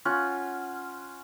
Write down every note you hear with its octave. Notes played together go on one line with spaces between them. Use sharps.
C#4 F4 F#5